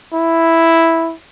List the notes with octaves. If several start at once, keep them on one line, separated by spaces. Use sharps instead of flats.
E4